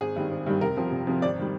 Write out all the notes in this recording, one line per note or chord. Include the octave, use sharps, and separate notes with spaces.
G#1 G#4
G2 D#3 G3
G#1
G2 D#3 G3
F1 A#4
F2 C3 F3
F1
F2 C3 F3
G#1 D5
D#3 G3